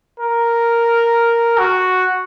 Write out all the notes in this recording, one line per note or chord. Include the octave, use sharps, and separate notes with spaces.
A#4
F#4